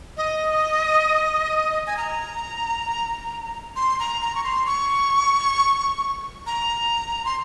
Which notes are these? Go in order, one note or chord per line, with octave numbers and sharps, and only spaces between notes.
D#5
G#5
A#5
C6
A#5
A#5
C#6
C6
C#6
A#5
C6